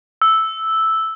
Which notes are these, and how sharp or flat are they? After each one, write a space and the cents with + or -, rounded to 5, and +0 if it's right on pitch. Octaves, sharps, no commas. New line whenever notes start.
E6 -5